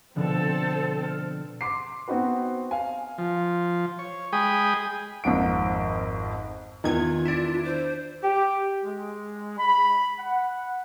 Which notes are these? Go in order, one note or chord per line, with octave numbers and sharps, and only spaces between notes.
B2 D3 F3 C4 A4
F6 D7
C6 D6 C7
B3 C4 D#4 F#4 B4
F5 G#5
F3
C#5
G#3 G#4 G5 B5 D#6
G#1 F2 G#2 D7
E2 D#3 F4 G#6
D4 E4
C5
G4
G#3
B5
F#5